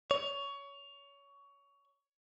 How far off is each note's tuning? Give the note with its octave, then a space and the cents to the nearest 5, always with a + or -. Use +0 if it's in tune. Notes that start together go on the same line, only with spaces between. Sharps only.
C#5 +20